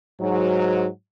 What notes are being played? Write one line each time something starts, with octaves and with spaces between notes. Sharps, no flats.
G#2 F#3